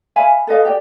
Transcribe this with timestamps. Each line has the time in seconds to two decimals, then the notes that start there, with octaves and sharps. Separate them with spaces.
0.16 E5 F5 G#5 B5
0.47 A4 B4 D#5 F5
0.65 G4 D5 G5